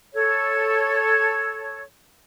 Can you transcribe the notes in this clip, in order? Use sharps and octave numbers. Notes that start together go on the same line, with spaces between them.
A4 C#5